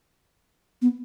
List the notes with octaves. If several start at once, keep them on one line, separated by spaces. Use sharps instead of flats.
B3